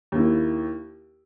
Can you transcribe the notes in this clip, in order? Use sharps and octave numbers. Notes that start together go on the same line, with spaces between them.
D#2 D#3 A#3 E4